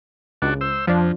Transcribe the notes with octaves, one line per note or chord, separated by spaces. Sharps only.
C#2 D4 F#4
C5 E6
F2 F3 D4